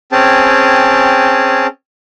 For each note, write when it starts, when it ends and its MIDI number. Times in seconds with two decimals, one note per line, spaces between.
0.12 1.67 60
0.12 1.67 61
0.12 1.67 68
0.12 1.67 79
0.12 1.67 81